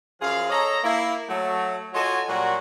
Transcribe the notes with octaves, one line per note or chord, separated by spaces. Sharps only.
F#2 F3 F4 G#4 F5
A4 C#5 D#5 A#5
A#3 E4
F#3 A3
F4 F#4 A4 C#5 D#5 G#5
A#2 F#3 G3 F#4